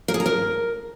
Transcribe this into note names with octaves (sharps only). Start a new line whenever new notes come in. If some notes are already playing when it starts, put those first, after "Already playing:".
A#4
G#4
A#5
A#4